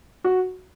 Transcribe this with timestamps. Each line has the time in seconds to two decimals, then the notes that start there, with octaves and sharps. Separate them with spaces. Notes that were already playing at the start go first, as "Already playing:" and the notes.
0.24 F#4